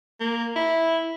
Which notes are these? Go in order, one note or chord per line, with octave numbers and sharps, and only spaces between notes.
A#3
E4